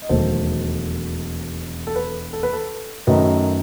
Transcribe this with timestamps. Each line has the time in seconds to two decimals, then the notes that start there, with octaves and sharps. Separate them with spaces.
0.02 D#5
0.09 E1 D#2 D#3 F#3 A3 A4 C5
1.87 A4
1.96 B4
2.33 A4
2.43 B4
2.53 A4
3.07 F#2 D#3 F#3 A3 B4 D#5